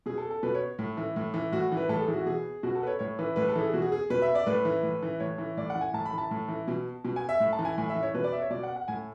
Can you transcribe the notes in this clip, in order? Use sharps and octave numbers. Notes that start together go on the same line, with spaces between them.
B2 G#4
A4
A4
B2 B4
C#5
A2
E3
A2
E3
A2 F#4
E3
B4
A2 A4
G#4
E3
F#4
B2 G#4
B2 F#4
A4
B4
C#5
A2 C#5
E3 B4
A2 B4
A4
E3
G#4
B2 F#4
G#4
G#4
B2 B4
E5
D5
A2 B4
E3
A2
E3
A2 C#5
E3
A2 D5
F#5
E3
G#5
A2 A5
B5
E3
A5
A2
E3
B2
B2
G#5
E5
A2
A5
E3
G#5
A2 G#5
E5
E3
C#5
B2 B4
D5
E5
C#5
B2 D5
F#5
F#5
A2 G#5